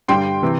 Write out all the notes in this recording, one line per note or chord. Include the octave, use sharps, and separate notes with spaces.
G2 D3 G3 G5 C6
C3 E3